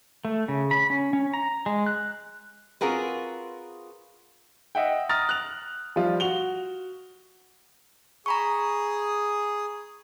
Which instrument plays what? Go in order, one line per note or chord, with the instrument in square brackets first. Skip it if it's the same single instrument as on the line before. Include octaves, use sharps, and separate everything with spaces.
[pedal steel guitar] A3
C#3
B5
C#4
C#4
A#5
G#3
F#6
[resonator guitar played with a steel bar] C4 F4 F#4 G#4 A#4 B4
[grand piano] D#5 E5 F#5 G5
A#5 D#6 F6 A6 A#6
F#6 F7
F3 G3 F4
F#4 F7 G7
[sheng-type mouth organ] G#4 D#6 [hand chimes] A#5 B5 C#6